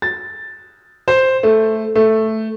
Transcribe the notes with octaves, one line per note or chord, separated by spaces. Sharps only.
A6
C5
A3
A3